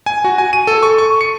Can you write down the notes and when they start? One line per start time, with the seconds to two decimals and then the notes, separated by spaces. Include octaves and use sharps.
0.06 G#5
0.24 F#4
0.38 G#5
0.53 D#7
0.67 A4
0.83 C#6
0.98 C#6
1.21 C#7